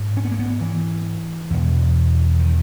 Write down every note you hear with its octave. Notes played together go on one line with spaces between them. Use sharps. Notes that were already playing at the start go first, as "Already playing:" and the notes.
Already playing: G#2
C#4
B3
A#3
B3
E3
E2 B2
D#3